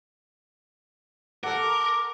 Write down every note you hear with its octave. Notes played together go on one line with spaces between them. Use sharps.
A4 A#4 F#5 D6